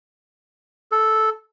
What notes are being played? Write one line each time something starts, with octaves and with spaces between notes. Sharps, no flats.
A4